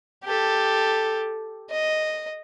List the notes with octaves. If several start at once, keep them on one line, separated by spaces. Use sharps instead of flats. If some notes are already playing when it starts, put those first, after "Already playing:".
G4 A4
D#5